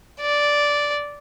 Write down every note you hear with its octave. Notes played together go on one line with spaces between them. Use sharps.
D5